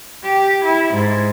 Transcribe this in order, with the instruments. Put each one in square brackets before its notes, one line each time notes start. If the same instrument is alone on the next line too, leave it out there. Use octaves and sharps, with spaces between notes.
[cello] G4
E4
G#2